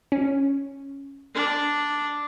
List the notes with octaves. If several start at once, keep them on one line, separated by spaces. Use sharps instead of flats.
C#4
D4